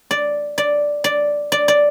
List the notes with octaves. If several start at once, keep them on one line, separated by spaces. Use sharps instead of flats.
D5
D5
D5
D5
D5